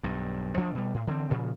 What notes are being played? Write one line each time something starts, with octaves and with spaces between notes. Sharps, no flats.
B1 G2
D2 F3 D4
B2 G3
A2
D3 E3 G#3 C4
A#2 C#3 F3